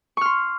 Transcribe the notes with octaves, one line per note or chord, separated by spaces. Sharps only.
C6 C#6 F6